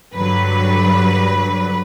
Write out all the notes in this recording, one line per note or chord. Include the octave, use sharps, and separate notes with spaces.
G2 D3 F#3 B4